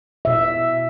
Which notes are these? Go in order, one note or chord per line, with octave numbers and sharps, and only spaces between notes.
B2 E5